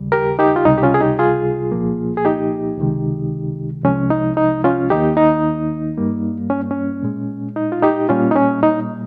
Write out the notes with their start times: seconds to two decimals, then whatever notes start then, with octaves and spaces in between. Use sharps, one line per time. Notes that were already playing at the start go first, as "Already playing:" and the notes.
Already playing: D#2 C#3 G3
0.12 G4 A#4
0.39 D#4 G4
0.56 F4
0.65 C#2 C3 G3 D#4
0.78 G4
0.83 C#4 F4
0.94 G#4
1.01 D#4 G4
1.19 F4 G#4
1.72 C2 A#2 F3 A#3
2.17 G#4
2.25 D#4 G4
2.78 C#2 C3 D#3 G#3
3.84 C2 C3 F3 G#3 C#4
4.10 D#4
4.37 D#4
4.64 C#4 F4
4.90 D#2 D#3 A#3 D#4 G4
5.17 D#4
5.98 G2 G3 A#3
6.50 C#4
6.71 C#4
7.03 A#2 G#3
7.56 D#4
7.72 F4
7.82 D#4 G4
8.09 A#2 G3 A#3 C#4 F4
8.31 D#4
8.36 C#4
8.63 D#4